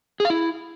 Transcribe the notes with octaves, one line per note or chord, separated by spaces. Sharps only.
G#4
F5
E4